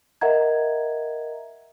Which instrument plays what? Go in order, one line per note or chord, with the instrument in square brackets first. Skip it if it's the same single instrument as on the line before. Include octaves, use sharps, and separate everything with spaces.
[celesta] A#4 D#5 E5 F#5 A#5 G#6